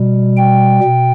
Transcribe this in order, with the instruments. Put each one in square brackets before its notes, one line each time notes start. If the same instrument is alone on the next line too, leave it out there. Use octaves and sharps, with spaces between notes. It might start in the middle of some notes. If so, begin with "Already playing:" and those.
Already playing: [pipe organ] B2 G3
G5
B2